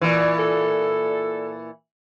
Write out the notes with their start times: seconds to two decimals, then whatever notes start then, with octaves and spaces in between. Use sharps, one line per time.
0.01 A#2 E3
0.39 A4